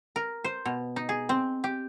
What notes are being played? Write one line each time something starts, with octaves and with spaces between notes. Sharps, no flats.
A#4
C5
B2
D#4
G#4
C4
G4